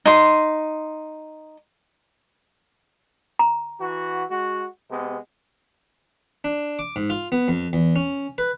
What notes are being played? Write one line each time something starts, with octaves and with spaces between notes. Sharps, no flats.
D#4 C6
A#5
E3 F#4
G#3 F#4
C3 G#3 B3
D4
D6
G#2
F4
B3
F2
E2
C#4
B4